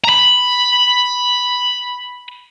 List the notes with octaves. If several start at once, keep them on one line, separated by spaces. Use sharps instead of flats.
A#5 B5